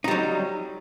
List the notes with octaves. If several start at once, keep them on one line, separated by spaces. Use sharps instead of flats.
F#3 G3 D#4